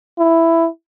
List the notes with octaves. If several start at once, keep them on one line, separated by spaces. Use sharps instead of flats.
E4